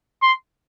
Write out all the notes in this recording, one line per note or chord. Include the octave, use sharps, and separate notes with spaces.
C6